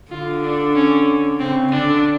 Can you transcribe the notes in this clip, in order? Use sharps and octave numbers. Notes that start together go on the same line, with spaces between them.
D3 F4
D4
C#4
C#3 C4
D3 D4